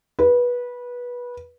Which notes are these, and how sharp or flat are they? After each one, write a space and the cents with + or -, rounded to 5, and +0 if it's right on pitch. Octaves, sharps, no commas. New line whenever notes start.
B4 -20